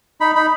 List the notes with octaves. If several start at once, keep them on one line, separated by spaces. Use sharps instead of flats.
D#4 B5
D#4 B5